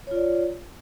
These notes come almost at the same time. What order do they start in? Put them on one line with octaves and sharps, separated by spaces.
C#5 F4 D5